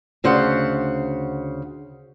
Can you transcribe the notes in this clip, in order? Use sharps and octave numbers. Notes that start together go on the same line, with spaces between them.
D2 C#3 C5 F#5